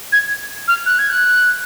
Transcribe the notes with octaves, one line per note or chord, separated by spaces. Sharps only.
G#6
F6
F#6
G#6
F#6